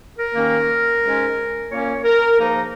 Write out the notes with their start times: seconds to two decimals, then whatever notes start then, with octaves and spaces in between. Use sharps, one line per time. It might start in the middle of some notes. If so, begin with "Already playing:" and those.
0.19 A#4
0.35 D#2 D#3 A#3 C#4
1.03 G#2 G#3 C#4
1.70 A#2 A#3 C#4 C#5
2.04 A#4
2.38 G#2 F3 A#3 D#4